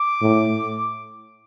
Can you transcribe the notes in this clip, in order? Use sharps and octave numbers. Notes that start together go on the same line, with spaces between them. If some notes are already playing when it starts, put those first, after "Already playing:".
Already playing: D6
A2